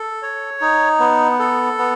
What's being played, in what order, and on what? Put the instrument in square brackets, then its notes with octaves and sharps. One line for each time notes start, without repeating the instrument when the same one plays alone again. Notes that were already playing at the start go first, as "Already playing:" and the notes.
Already playing: [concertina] A4
C#5
D#4
B3
A4
B3